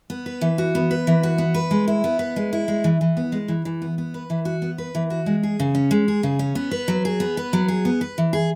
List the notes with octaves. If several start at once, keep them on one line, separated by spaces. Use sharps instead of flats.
B3
B4
E3
F#4
B3
B4
E3
F#4
B3
B4
G#3
E4
B3
B4
G#3
E4
G#3
E3
E3
B3
G#3
E3
E3
B3
B3
B4
E3
F#4
B3
B4
E3
F#4
G#3
G#4
C#3
C#4
G#3
G#4
C#3
C#4
B3
B4
F#3
G#4
B3
B4
F#3
G#4
B3
B4
E3
G#4